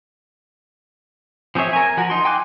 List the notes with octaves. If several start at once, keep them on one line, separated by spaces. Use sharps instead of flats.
F3 C4 G#4 C#5 E5
A#4 G#5
F3 F#4 A#4
D#4 C6
G5 G#5 C6 D6 F#6